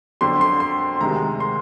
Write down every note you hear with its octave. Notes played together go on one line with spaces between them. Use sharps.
F2 D3 F#3 C6
C6
C6
D2 C3 D#3 G#3 A#5
C6